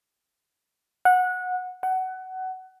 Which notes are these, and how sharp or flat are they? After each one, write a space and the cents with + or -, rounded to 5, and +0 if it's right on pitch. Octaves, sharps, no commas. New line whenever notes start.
F#5 -20
F#5 +20